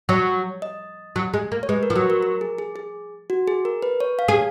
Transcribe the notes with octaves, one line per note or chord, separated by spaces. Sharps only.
F#3 C#5
D#5
F#3
G#3
A#3
C#5
G#3 B4
A#4
F3
F#3 F#4
A#4
A#4
G#4
G#4
G#4
F#4
G#4
A#4
B4
C#5
F5
G#4